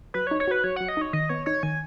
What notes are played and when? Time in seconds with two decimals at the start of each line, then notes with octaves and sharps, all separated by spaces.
0.14 F#3 B4
0.27 C#5
0.31 D#4
0.40 C#5
0.48 F#4 B4
0.64 F#3 C#5
0.76 F#3 F#5
0.89 D#5
0.97 D#4 C#5
1.13 D#3 D#5
1.29 B3 C#5
1.46 D#4 C#5
1.63 D#3 G#5